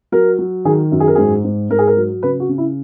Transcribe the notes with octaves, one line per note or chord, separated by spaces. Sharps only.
F#3 A#4
F#3
D#3 G#4
F#2
G#4
A#4
G#2 G#4
G#2
G#2 A#4
G#4
A#4
F#3
C#3 B4
F#4
C#3
E4